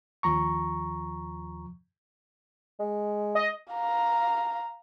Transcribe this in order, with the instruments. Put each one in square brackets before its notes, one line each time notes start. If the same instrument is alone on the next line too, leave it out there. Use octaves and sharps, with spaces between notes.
[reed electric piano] D#2 F3 A#5 C#6
[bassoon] G#3
[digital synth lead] D#5
[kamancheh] F5 A#5